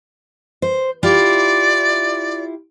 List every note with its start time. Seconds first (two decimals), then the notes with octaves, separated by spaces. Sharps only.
0.62 C5
1.03 E4 F4 G4 D5